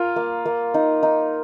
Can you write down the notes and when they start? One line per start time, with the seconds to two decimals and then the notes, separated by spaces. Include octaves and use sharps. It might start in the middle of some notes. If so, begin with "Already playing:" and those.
Already playing: F4 A#4
0.16 A#3
0.46 A#3
0.74 D#4
1.03 D#4